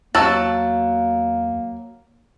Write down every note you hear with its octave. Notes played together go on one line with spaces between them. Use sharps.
E2 F#3 A#3 A5 E6